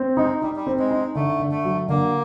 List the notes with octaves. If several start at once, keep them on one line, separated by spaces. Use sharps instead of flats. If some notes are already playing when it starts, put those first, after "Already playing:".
Already playing: C4
G#3 D#4
G3 D#4
G3
C4
G#3
D#4
D3 A3
D3
A3
F#3
D3 A#3